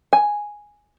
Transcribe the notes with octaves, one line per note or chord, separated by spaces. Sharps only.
G#5